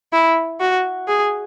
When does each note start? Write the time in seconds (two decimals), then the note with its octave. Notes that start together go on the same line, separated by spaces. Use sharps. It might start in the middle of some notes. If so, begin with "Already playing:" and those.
0.13 E4
0.60 F#4
1.08 G#4